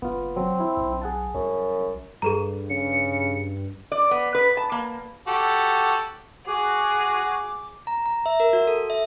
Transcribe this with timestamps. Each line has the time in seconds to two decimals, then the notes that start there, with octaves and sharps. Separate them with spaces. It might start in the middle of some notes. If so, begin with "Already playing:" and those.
0.02 F#1 B3 F4
0.36 F#3 C4
0.60 E4
0.77 B1
1.02 G#4 F#5 A5
1.35 C2 F#2
2.22 G2 G#4 A4 A#5
2.70 C#3 C#7
3.92 D5
4.11 B3
4.35 B4
4.57 A5
4.72 A#3
5.27 F#4 G4 A4
6.47 F#4 G#4 D6
7.87 A#5
8.06 A#5
8.26 E5
8.40 A#4
8.53 F#4
8.67 A4
8.90 E5